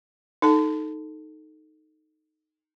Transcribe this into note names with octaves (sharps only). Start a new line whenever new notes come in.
D#4 A4 A5